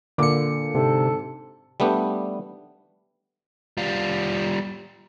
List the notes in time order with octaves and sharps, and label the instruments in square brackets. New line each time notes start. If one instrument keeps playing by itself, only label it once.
[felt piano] A#2 D6 [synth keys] D3 C#7
[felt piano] G#2 [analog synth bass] C3 [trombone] A4
[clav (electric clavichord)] G3 A3 B3 D4 G4
[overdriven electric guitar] G3 F4